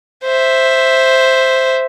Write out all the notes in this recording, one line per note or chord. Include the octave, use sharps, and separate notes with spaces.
C5 E5